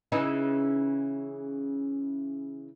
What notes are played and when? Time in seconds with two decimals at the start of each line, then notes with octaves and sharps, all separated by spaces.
0.12 C#3 E3 D#4